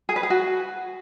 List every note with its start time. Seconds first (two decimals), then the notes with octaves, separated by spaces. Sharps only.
0.09 G#4
0.16 B4
0.23 G#4
0.30 F#4